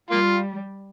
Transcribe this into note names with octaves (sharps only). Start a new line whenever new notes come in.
G3 A#3 F4